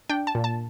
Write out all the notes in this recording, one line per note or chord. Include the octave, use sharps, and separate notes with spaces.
D4 G5
A5
A#2
A5